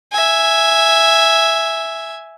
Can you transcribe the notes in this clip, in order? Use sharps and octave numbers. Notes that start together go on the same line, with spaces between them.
E5 G#5